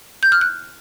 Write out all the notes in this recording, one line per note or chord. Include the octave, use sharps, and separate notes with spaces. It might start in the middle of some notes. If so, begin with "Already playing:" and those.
G6
F6
F#6